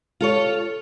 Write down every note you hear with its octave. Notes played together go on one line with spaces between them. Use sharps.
F4 A4 C#5